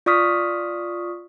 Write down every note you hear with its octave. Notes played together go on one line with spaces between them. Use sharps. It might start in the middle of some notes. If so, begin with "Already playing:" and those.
F4 D5 C#6 D#6 F6 B6